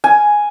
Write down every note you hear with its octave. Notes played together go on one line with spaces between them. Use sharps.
G#5